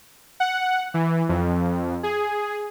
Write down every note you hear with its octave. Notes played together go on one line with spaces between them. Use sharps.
F#5
E3
F2
G#4